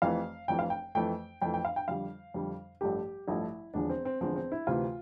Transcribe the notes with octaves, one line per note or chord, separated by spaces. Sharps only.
F1 F2 E3 F5
F1 F2 E3 G5
F5
G5
F2 E3 A3 G5
F2 E3 A3 G5
G5
F5
G5
F2 D3 G3 F5
F2 D3 G3
A1 G2 F3 A3 G4
A1 G2 F3 A3 E4
E1 E2 D3 F3 D4
C4
C4
E1 E2 D3 F3 C4
C4
E4
D2 C3 E3 F4